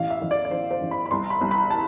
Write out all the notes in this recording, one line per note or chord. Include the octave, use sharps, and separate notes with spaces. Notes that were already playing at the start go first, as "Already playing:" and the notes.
Already playing: A1 F5
E5
A1
D5
D5
A1 C5
C5
A1
B5
B5
C2 C6
B5
C2
B5
A5